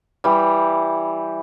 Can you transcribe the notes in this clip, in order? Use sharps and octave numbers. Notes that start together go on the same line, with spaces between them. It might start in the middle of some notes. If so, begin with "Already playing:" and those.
E3 G3